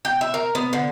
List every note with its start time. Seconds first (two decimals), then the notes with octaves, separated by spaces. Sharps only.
0.05 G5
0.21 E5
0.34 A#4
0.55 B3
0.73 D3